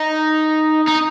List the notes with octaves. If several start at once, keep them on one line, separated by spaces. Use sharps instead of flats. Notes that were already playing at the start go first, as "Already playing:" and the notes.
Already playing: D#4
D#4